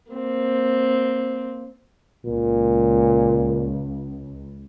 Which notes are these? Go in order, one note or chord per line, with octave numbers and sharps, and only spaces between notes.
A#3 C4
C#2 A#2